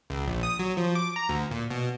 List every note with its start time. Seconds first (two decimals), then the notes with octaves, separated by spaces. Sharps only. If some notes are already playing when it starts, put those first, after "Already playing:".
0.10 C#2
0.26 A#1
0.43 D#6
0.59 F#3
0.77 F3
0.95 D6
1.16 A#5
1.29 D2
1.51 A#2
1.70 B2